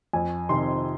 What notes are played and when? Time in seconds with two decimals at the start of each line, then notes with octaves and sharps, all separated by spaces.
0.13 F2 G#5
0.49 C3 D#3 C6